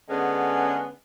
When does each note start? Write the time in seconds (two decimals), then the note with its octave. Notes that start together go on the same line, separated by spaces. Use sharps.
0.10 D3 G#3 B3 C#4 G#4